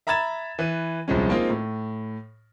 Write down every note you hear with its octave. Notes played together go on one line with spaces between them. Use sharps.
E5 A#5 B5 G#6 A6 E7
E3 B4 D#7
D#1 C2 F3 G#3 C#4
G#3 A#3 C4 D#4 F4
A2